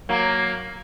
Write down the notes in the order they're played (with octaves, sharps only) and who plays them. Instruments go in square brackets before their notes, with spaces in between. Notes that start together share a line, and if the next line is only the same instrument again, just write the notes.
[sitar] F#3 A#3